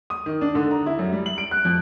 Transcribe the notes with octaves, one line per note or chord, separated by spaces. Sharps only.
D#6
D#3
D4
D3
A#5
E4
F#2
G3
F#7
D7
F#6
F2